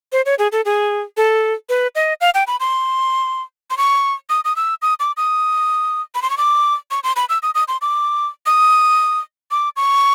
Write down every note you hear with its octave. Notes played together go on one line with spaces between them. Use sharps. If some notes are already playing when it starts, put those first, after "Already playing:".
C5
C#5
G#4
A4
G#4
A4
B4
D#5
F5
G5
B5
C6
C6
C#6
D#6
D#6
E6
D#6
D6
D#6
B5
C6
C#6
D6
C#6
C6
B5
E6
D#6
D#6
C6
D6
D#6
D6
C#6